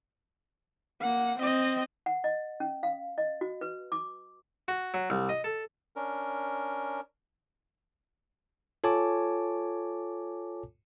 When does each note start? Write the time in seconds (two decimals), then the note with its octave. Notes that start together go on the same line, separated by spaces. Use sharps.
1.01 A#3 F#5
1.39 C4 D#5
2.06 F#5
2.24 D#5
2.60 C#4
2.83 F5
3.18 D#5
3.41 F#4
3.61 B4
3.92 D6
4.68 F#4
4.94 F#3
5.10 C2
5.29 D#5
5.44 A4
5.96 C#4 D4 A#4
8.84 F4 A4 C#5 G#5 A5 D6